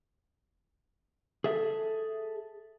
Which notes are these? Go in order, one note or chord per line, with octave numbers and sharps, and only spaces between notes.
G#4 A4 E5